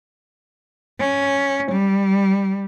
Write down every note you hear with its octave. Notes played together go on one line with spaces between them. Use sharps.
C#4
G3